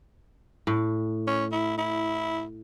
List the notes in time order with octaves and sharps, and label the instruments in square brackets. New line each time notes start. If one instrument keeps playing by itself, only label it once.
[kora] A2
[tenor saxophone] C#4
E4
E4